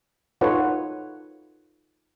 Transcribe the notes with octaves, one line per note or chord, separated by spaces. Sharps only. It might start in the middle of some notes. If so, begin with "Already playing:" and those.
D#4 F4 A4 B4 C#5 F#5